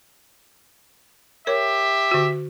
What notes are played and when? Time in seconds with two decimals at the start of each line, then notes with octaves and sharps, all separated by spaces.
1.47 G4 A#4 C#5 E5
2.11 D3 F#4